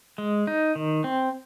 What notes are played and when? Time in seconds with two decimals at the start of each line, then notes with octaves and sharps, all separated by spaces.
0.18 G#3
0.47 D#4
0.76 D#3
1.04 C4